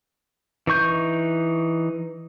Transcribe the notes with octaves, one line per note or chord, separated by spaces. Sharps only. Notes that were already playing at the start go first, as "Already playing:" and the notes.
E3 D#4 C#6 G6